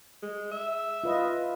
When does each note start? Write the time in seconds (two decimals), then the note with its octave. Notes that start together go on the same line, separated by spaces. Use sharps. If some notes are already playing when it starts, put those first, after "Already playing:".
0.22 G#3
0.51 E5
1.04 F4 B4 D#5